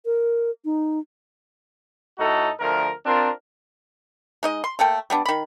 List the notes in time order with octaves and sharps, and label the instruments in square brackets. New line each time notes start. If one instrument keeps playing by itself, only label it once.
[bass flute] A#4
D#4
[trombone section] A2 D#4 F#4 A4
D2 F3 A#4
C4 D4 F4 A#4
[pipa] G#3 D#4 D#5
C6
A3 A#3 A4 G5
G3 B3 D4
D#3 B5